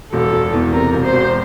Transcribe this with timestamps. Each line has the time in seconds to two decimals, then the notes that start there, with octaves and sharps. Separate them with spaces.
0.13 E1 A4
0.32 E1
0.53 E2
0.72 C3 A#4
0.93 E1
1.03 C5
1.13 E1